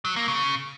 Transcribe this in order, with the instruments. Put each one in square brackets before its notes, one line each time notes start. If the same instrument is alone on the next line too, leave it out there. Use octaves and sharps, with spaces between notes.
[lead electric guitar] F#3
A#3
C#3